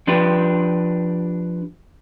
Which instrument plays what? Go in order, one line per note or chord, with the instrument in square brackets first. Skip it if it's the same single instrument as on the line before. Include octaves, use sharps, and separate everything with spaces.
[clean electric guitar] F3 D4 G4 B4